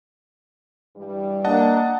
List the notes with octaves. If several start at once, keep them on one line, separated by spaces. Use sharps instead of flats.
G2 E3 G3
A#3 D4 D#5 F#5 A5